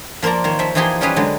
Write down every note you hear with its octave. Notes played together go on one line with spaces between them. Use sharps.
F3 A#3 C5 D5 A#5
D#3 C5 C#5
F3 E5
E3 F3 D#4 G4 G#4 C6
G3 C#4 G4 G#4 B4
D3 F#3 G#3